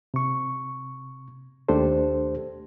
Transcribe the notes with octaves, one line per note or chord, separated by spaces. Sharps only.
C3 C#6
D#2 A3 D4 G4 A4 C5